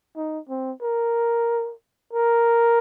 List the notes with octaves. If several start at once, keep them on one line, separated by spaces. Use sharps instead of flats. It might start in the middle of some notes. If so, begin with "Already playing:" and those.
D#4
C4
A#4
A#4